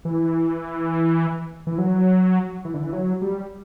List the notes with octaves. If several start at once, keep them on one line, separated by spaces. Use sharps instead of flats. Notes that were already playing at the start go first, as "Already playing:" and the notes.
E3
E3
F#3
E3
D3
E3
F#3
G3